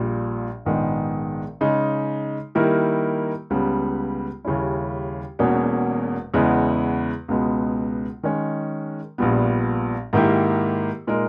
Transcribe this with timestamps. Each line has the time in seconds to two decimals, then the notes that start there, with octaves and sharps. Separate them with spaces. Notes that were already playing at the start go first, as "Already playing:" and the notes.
Already playing: A#1 A#2 G3
0.66 A#1 G#2 D#3 G#3 B3
1.61 C#3 G#3 D#4
2.55 D#3 G3 A#3 E4 A#4
3.50 C#2 C#3 G3 B3
4.45 D#2 C#3 G3 C#4 E4
5.39 E1 E2 B2 A#3 C#4
6.34 E2 C#3 G#3 B3 E4
7.28 C#2 B2 G#3 B3
8.23 D#3 G#3 C#4
9.18 A#1 A#2 G3 B3
10.13 G#2 D#3 A#3 E4 G4
11.07 A#2 G#3 D#4 A#4